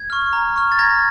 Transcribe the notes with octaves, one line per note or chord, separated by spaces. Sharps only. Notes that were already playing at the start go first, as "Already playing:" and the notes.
Already playing: G#6
C#6 F6
A#5
C#6 F6
A6
A#5 G#6 A#6